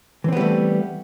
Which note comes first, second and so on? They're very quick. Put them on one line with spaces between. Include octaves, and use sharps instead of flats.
E3 C4 B3 G3 A3